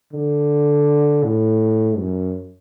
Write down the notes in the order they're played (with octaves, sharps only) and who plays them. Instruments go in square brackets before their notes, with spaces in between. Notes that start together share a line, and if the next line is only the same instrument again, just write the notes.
[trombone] D3
A2
F#2